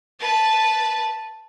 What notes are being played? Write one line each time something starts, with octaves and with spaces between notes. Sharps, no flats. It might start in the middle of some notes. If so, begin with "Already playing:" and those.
B4 A5